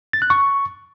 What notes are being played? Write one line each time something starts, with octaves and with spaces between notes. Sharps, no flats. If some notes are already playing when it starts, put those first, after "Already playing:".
A6
F#6
C#6